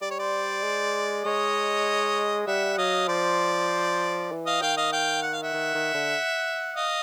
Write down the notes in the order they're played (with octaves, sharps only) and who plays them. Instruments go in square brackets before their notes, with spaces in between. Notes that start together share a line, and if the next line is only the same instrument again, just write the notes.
[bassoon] G3 [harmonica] D5
[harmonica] C#5
C5 D5
[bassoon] G#3
[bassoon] G#3 [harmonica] C#5 D#5
[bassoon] G3 [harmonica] E5 F#5
[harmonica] F#5
[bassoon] F#3 [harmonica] D#5 F5
[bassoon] F3 [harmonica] C5 D5
[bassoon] E3
[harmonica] D#5 F5
[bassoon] D#3 [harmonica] F5 G5
[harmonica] D#5 F5
F5 G5
F#5
F5
E5 F#5
[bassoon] D#3
D#3
D3
[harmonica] D#5 F5